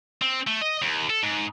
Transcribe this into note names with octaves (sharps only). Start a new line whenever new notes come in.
C4
A3
D#5
D#2
A4
G#2